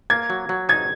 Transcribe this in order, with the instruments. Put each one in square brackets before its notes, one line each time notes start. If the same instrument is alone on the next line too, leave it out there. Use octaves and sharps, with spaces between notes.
[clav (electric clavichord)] A#3 [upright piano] G#6
[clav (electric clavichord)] F#3
F#3
[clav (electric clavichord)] D#4 [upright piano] G#6